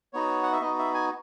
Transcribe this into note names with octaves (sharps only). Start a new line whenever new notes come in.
B3 D#4 F#4 C#5
F#5
E5
B3 D#4 F#4 D#5
E5
G#5